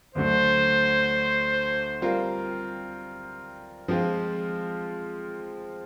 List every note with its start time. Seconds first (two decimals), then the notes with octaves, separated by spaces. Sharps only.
0.15 D2 D3 F#3 A3 C5
2.01 G3 C4 F4 A#4
3.88 F3 G#3 C4 F4